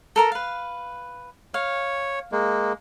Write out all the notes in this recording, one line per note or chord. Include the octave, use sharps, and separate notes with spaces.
A4 A#4 A#5
B4 F5
C#5 F5
G#3 A#3